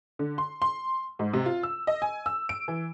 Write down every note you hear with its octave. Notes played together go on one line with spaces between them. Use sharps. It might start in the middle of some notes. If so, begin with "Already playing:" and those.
D3
C6
C6
G#2
C3
F4
E6
D#5
G#5
E6
D7
E3